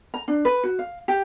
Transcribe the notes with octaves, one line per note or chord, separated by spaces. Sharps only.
A#5
D4
B4
F#4
F5
G4